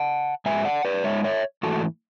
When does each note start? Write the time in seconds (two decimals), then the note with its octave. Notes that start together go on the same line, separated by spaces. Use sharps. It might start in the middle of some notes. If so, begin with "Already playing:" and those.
Already playing: F#5 A5
0.46 G#2 G#3 E5 G#5
0.65 D5 F#5
0.85 B4 D5
1.04 G#2 G#3 C#5 E5
1.24 C#5 E5
1.63 G#2 E3 A3 F#4 A4